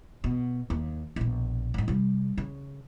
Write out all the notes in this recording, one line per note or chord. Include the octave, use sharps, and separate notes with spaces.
B2
D#2
A#1 B2
D2 G#2
C3 G3
C#3